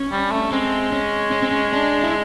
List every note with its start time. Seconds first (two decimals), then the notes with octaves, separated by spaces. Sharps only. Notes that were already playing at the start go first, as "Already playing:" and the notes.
Already playing: C#4
0.12 G3
0.31 A3
0.52 G#3 C4
0.92 C#4
1.32 C#4
1.42 C4
1.51 C#4
1.73 D4
2.03 E4